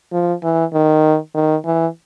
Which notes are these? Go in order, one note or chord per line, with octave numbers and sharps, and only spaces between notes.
F3
E3
D#3
D#3
E3